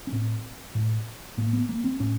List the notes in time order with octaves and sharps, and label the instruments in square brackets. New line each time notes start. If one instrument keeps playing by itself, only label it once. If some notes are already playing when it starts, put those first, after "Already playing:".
[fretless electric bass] C#4
A2 C4
A2
A2 A#3
B3
A#3
C4
A2 C#4